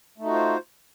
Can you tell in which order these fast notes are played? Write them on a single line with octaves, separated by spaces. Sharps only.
A3 D#4 F#4 F4 C5